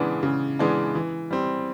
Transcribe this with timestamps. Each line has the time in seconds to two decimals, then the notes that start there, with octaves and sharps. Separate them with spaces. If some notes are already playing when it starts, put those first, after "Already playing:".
Already playing: C#3 E3 G#3 B3 D4
0.23 C#3
0.59 E3 G#3 B3 D4
0.95 E3
1.31 G3 C4